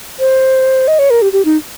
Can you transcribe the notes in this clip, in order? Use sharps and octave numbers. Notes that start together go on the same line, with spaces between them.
C5
D#5
C#5
A#4
G4
G4
D#4